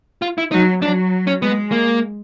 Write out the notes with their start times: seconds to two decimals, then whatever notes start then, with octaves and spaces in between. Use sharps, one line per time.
0.22 F4
0.38 E4
0.52 F#3 D#4
0.82 F#3 D4
1.27 C#4
1.42 G#3 B3
1.71 A#3